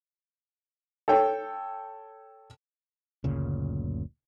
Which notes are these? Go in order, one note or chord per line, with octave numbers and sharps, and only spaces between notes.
A4 C#5 G5
F#1 D2 A#2 C#3